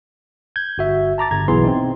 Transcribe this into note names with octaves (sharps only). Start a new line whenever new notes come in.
G6 G#6
G1 F#4 E5
A5 A#5 D6 A6
G1 A#5 G#6
B1 E3 B3 G#4 C6
C4 D#4